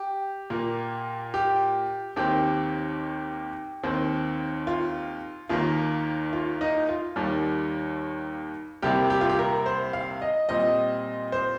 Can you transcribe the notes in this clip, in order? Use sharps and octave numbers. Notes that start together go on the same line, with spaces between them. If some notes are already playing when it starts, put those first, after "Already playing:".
Already playing: G4
A#2 A#3
G4
D#2 D#3 C4 G4
D#2 D#3 C4
F4
D#2 D#3 A#3 F4
F4
D#4
F4
D#2 D#3 G3
C2 C3 G3 A#3 G4
G4
F4
G4
A#4
C5
F5
D#5
A#2 G3 C4 D#5
C5